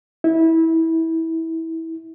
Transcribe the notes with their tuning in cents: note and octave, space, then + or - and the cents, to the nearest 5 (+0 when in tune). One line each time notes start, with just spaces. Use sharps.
E4 -20